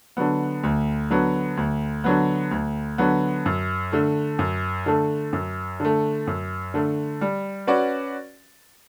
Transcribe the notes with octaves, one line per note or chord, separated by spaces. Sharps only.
D3 F#3 B3
D2
D3 F#3 B3
D2
D3 F#3 B3
D2
D3 F#3 B3
F#2
D3 A3
F#2
D3 A3
F#2
D3 A3
F#2
D3 A3
G3
C#4 F#4 B4 D5